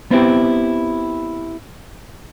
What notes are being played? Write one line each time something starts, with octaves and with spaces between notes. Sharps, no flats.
B3 C4 E4 G4